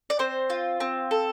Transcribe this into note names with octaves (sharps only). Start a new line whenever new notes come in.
D5
C4 C5
F4
C4
A4